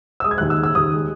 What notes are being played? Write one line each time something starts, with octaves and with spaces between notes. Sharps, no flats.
E6
G#3 D#6
G#6
D#2 F#6
E6
C#3
E6
D#2 D#6
G#3